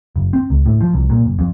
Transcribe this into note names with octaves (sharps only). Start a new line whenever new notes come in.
F#1
C4
C#2
A2
F3
C2
A#2
F#1
F2